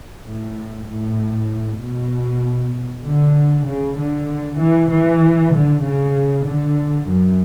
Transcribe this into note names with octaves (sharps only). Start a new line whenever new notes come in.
A2
A2
B2
D3
C#3
D3
E3
E3
D3
C#3
D3
F#2